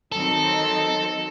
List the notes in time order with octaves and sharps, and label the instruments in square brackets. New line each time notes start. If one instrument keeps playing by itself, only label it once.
[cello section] D#3 F#3 C4 D#4 [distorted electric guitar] A4